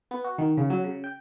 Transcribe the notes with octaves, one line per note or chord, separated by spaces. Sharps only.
B3
F#4
D#3
C#3
F#3
C#3
G5